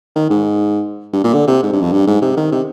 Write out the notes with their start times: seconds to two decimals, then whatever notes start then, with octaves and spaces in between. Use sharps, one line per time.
0.16 D#3
0.30 G#2
1.13 G2
1.24 A#2
1.34 D3
1.48 C3
1.63 G#2
1.73 G2
1.82 F2
1.92 G2
2.07 G#2
2.22 C3
2.37 D#3
2.52 C3